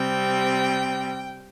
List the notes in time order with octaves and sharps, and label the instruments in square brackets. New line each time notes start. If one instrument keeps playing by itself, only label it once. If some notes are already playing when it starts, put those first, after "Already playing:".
Already playing: [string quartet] C3 G3 C4 G5